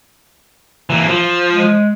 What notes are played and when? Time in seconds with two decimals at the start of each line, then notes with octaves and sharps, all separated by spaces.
0.90 E3 A#3
1.08 F3
1.51 G#3